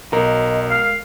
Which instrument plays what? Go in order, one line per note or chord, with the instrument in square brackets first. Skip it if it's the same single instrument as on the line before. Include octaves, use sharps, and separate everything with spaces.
[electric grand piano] B1 [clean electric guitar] A#4 [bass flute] D#5
[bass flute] G#3 [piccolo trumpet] F5